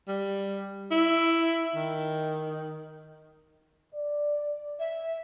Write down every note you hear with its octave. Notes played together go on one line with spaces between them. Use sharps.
G3
E4
D#3
D5
E5